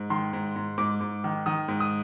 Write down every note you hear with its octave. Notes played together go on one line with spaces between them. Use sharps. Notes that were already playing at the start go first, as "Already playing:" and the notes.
Already playing: G#2
D#3 C6
G#2
G#2
G#2 D6
G#2
D#3
D#3 D#6
G#2
D#6